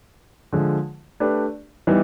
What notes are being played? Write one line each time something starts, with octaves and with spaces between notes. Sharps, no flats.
D3 F3 G#3
A3 D4 G4 B4
E3 G3 B3 D#4